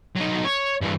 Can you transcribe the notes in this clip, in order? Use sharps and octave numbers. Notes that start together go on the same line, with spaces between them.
F#3 D#4
C#5
G2 E3